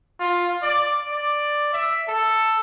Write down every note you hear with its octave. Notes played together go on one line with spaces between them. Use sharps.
F4
D5
D5
E5
A4